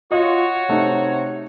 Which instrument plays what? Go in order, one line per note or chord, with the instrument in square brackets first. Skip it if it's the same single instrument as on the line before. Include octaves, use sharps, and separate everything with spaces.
[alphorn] F4 [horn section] F#4 C#5 [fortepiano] D#5
[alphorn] C3 [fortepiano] A3 D#4